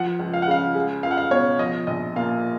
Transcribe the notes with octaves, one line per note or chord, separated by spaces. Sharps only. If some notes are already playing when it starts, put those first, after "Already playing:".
Already playing: F3 F#5
C#2
F5
F#5
C#3 F5
G#3
C#2 F5
F#5
F5
B2 C#5
F3 D#5
A#1 D#5
A#2 F5